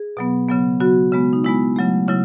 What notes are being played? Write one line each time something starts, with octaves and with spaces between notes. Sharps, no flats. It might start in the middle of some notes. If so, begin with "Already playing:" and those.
Already playing: G#4
B2 F#3 B3
C#3 F#3 B3
C#3 F#3 B3 F#4
C#3 G#3 B3
D#4
C#3 G#3 B3 E4
C#3 F#3 A3
C#3 F#3 E4